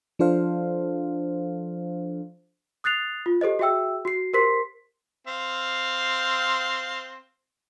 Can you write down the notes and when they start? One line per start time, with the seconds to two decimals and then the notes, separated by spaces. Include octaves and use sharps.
0.19 F3 D4 A4 C5 F5
2.84 D#6 F#6 A6 C7 F7
3.26 F4
3.41 G4 A4 C5 D#5
3.59 F#4 G#4 E5 G5 E6
4.05 F#4 C7
4.33 G4 A#4 C5 C6 B6 C7
5.27 C4 F5